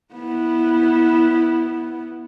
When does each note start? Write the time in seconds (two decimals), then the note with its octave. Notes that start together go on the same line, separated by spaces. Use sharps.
0.14 B3 E4